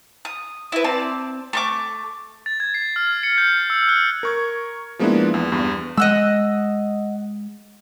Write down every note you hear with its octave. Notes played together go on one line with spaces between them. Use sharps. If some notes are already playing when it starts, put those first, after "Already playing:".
D#6
E4 B4
C4 D5 A5
A3 C#6 D6
A6
G#6
C7
F6
C#7
G6
E6
F#6
A#4 C#6 G#6
F3 G#3 A#3 B3 D4 E4
E2
E2 G2
G#3 D#5 F#5 E6